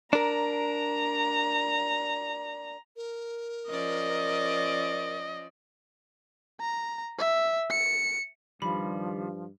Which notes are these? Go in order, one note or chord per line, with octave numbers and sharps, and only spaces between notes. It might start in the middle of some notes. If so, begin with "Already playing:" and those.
D4 A#4 A#5
A#4
F3 C#4 D5 D#5
A#5
E5
C#7
G2 D#3 F3 G3 B5